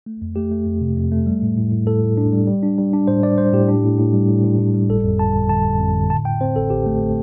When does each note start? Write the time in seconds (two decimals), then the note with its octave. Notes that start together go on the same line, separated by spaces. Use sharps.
0.06 A3
0.21 F2
0.36 A3 G4
0.52 A3
0.66 F2
0.81 C3
0.97 F2
1.12 A3
1.26 G3
1.42 A2
1.58 A2
1.72 A2
1.87 A2 A4
2.02 A2
2.17 D4
2.33 G3
2.47 G3
2.63 D4
2.78 G3
2.93 D4
3.08 A2 C5
3.23 G3 D5
3.38 G3 C5
3.53 A2 G4
3.68 D4
3.84 A2
3.98 A2
4.14 G3
4.29 A2
4.44 A2
4.59 A2
4.74 G3
4.89 G1 A4
5.04 F2
5.19 G1 A5
5.34 G1
5.49 D3 A5
5.64 G1
5.80 F2
5.95 D3
6.10 A2 A5
6.25 A2 G5
6.41 C4 C5
6.55 A1 A4
6.70 A1 G4
6.86 A3
7.01 A3